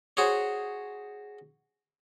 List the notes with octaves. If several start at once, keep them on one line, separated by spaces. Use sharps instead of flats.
F#4 G#4 C5 C#5